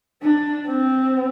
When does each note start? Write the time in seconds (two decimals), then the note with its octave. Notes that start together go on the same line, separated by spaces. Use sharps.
0.22 D4
0.66 C4